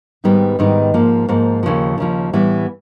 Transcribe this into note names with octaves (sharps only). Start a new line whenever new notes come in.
G#2 D#3 G3 B3 D#4
G#2 D#3 G3 B3 D#4
G#2 F3 A#3
G#2 F3 A#3
D#2 C#3 F3
D#2 C#3 F3
A2 E3 G3 B3